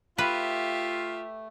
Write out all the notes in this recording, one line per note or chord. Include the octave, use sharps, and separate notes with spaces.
A3 F4 G4 B4 E5